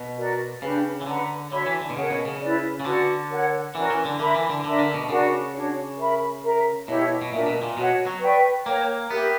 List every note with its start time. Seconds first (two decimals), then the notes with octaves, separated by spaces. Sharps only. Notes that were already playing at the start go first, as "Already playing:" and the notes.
Already playing: B2
0.17 F#4 A#4 D5
0.62 C#3 D4 G4 B4
1.01 E3
1.06 D3 B4 F#5 A#5
1.51 D3 F#4 C#5 E5 B5
1.66 E3
1.81 D3
1.90 B2
1.96 C#3 A#4 C#5 F#5
2.11 B2
2.26 C#3
2.41 E4 B4 D5
2.80 C#3
2.85 D3 F#4 B4 D5
3.30 A#4 C#5 F#5
3.75 E3 C#4 F#4 A#4 D5
3.90 E3
4.05 D3
4.19 D3 A#4 E5 B5
4.34 E3
4.50 D3
4.64 D3 D4 A#4 E5
4.79 D3
4.94 B2
5.09 C#3 D4 F#4 A#4 D5
5.54 D4 F#4 C#5
5.99 A#4 E5 B5
6.43 A#4 E5 A#5
6.88 B2 E4 G4 C#5 E5
7.22 B2
7.32 A#2 D4 A#4 E5
7.47 B2
7.62 A#2
7.77 B2 F#4 C#5 F#5
8.06 F#3
8.22 B4 D5 G5 C#6
8.66 A#3 A#4 C#5 G5 A#5
9.11 B3 G4 A#4 E5